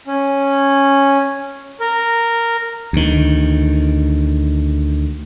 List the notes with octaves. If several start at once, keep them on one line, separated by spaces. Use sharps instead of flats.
C#4
A#4
D2 D#3